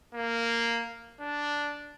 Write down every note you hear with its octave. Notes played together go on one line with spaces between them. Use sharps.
A#3
D4